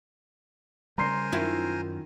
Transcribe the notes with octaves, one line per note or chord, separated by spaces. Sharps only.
C#3 G3 A#4 C5 G#5 A#5 C6 C7
F#2 D#3 C#4 E4 F4